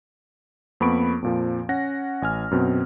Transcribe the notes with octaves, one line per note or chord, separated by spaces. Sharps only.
F2 A#3 B3 B5 C#6 D7
F2 A#2 F3
C#4 F#5 A#6
A1 G#5 F6
F#2 B2 C4